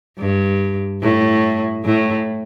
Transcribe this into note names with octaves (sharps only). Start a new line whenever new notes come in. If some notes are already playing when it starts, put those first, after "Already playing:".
G2
A2
A2